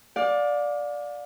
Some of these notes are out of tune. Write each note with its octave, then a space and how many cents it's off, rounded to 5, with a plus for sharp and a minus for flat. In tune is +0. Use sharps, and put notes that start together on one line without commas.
D5 +0 F5 +35